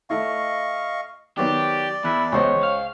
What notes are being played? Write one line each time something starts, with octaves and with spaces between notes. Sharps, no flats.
A3 E4 D#5 F5 C#6
D#3 F#3 B3 G4 D5
E2 E4 F#6
C#2 C5 C#5 D#5
F5